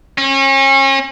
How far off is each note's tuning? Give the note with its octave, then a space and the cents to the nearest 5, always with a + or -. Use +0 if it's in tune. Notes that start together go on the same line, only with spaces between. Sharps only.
C#4 -35